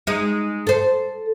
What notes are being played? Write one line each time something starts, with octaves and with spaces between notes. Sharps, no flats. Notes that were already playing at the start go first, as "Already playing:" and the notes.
G#3 D#4
A4 C5